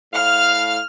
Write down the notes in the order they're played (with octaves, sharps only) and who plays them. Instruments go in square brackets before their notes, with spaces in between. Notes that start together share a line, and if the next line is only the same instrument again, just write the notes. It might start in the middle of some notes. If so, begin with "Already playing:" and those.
[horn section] A2 F5 [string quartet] F6